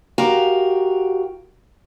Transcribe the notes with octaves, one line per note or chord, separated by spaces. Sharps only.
F#4 G4 A#4 F5 A#5